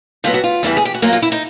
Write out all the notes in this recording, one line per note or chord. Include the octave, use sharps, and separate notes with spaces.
B2 F#3 B3 F4
F#4
F4
E2 C#3 E3 G3
G#4
G4
F#4
A#2 F#3 A#3 F4
F4
E4
D#4